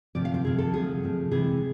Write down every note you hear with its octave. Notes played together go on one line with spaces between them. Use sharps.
D2 C3 F3 D5
F5
C5
D2 C3 F3 G#4
A4
D2 C3 F3 G#4
D2 C3 F3
C3 E3 G#3 G#4